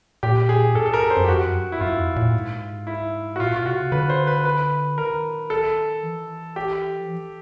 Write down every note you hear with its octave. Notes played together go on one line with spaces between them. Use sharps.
A#2 G4
G#4
G2 A4
A4
A#4
C5
F#2
G4
F2 F#4
F#2
G2
E4
G2 F4
F2
A#2
G#2
E4
F#4
A#2 F4
B2 F4
C3 F#4
C#3
D3 B4
C5
B4
B4
D#3 A#4
A4
E3
G4
F3
E3